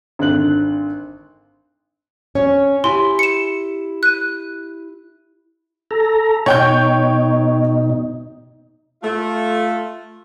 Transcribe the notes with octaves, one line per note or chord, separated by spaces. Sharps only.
G#1 D3 F#6 F#7
C#4 C#5
E4 G4 G#5 C6
C#7 E7
F#6 D#7
A4 A#5
B2 D#4 C#5 G5 G6
A3 F4